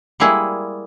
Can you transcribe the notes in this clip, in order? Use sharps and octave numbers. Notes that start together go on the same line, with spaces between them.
G3 G#3 A#3 E4 G#4